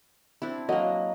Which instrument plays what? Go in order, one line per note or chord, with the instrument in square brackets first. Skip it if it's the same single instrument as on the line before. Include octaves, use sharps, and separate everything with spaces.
[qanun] C4 D4 E4
[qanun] F#3 A#3 [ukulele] D#5